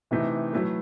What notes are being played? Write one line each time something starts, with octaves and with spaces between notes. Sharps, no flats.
C3 E3 A3 D#4
F#3 A3 E4 B4